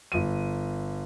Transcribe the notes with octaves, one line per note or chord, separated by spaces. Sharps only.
G1 D#7